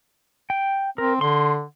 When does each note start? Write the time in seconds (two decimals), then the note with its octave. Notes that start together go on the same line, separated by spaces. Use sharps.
0.50 G5
0.98 C4 A#4
1.21 D3 C6